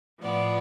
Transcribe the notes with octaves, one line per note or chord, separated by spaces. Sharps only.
A2 F3 B3 D5